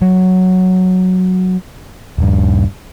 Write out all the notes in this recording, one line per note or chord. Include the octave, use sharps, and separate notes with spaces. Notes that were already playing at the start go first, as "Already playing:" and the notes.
F#3
D#1 G2